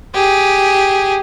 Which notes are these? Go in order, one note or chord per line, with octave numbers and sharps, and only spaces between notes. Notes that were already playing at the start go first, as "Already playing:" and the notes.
G4 G#4